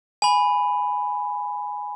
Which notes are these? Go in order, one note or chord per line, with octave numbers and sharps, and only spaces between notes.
G#5 B5